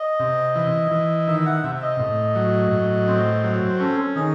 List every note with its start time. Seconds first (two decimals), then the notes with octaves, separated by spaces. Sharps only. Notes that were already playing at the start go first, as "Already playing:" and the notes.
Already playing: D#5
0.19 C3
0.55 E3
0.91 E3
1.27 D#3 E5
1.46 F#5
1.63 C3 E5
1.75 E5
1.82 D#5
2.00 A2
2.35 F#3
2.71 A2
3.08 C4
3.44 F#3 C#5
3.69 C5
3.80 C#4 A4
4.16 D#3 G#4